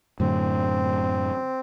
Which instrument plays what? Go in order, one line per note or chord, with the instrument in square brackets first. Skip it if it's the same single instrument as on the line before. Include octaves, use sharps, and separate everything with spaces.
[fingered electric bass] F#2 A2 D3 [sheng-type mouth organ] C4